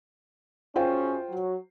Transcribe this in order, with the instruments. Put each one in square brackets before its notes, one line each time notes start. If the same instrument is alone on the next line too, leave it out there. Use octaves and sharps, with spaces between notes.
[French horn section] F#2 C#4 G#4 [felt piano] F4 C5 G5
[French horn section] F#3